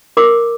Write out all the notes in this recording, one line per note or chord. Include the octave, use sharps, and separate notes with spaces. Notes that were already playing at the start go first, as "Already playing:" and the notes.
A#4 D6